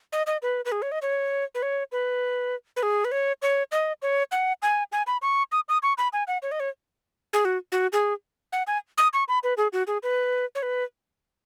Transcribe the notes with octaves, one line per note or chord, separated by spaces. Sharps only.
D#5
D#5
B4
B4
G#4
C#5
D#5
C#5
B4
C#5
B4
B4
G#4
B4
C#5
C#5
D#5
C#5
F#5
G#5
G#5
B5
C#6
D#6
D#6
C#6
B5
G#5
F#5
C#5
D#5
C#5
G#4
F#4
F#4
G#4
F#5
G#5
D#6
C#6
B5
B4
G#4
F#4
G#4
B4
C#5
B4